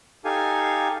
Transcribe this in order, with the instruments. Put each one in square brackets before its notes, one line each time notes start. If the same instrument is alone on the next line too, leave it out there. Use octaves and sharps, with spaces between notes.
[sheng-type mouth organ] D#4 G4 A4 F5 G#5